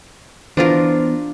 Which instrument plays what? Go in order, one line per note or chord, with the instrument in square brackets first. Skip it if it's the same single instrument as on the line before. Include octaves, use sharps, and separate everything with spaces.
[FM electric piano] E3 B3 C5 [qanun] D4 F4 A#4